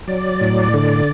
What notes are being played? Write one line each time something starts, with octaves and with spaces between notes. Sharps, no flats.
F#3 D5
A2
D3